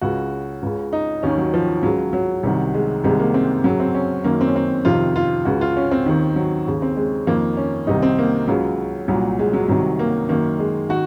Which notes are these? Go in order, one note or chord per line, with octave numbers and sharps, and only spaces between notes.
C#2 C#3 F#4
C#2 C#3
D#4
D#2 D#3 C#4
F#3
F3
C#2 C#3 F#3
F#3
C2 C3 D#3
G#3
C2 C3 D#3 G#3
A#3
C4
F#2 C#3 F#3
C4
C#4
F#2 D#3 A#3
C4
C#4
C4
F2 C3 D#3 F4
F4
C#2 C#3 F#4
F4
C#4
C4
D#2 D#3
F#3
D#2 C#3
C4
G#3
F2 D#3 A#3
C#4
C2 C3 D#3 D#4
C4
A#3
C#2 C#3 F#3
C2 A#2 F#3
G#3
F#3
C2 C3 D#3 F#3
A#3
F#2 D#3 A#3
G#3
D#3 F#4